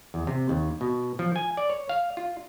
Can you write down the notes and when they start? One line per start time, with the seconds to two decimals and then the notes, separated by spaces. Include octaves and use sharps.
0.14 E2
0.27 C3
0.49 D#2
0.81 B2
1.19 F3
1.36 G#5
1.57 D5
1.70 C#5
1.89 F5
2.17 F4